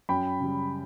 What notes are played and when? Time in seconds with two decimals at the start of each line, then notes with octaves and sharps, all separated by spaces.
0.09 F#2 G5 B5
0.40 C#3 G3